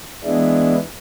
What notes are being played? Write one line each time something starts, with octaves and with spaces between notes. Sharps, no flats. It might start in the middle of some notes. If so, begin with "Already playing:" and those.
E3 G#3 B3 D4 E4